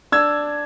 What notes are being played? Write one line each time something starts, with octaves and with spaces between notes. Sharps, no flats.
D4 E6 G#6